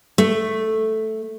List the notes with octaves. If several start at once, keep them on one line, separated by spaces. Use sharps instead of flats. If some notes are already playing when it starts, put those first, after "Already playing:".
A3